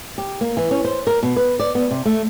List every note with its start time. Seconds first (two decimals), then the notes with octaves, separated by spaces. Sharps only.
0.18 G4
0.41 A#3
0.57 E3
0.71 C#4
0.84 C5
1.07 A#4
1.23 B2
1.36 B4
1.60 D5
1.75 B3
1.91 C3
2.05 A3